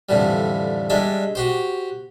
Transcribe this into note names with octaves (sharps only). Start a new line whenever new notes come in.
F2 A2 D3 E3 G3
G3 G#3 D4 E5
F#4 G4 C5